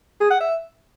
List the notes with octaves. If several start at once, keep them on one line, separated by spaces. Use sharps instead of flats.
G#4
F#5
E5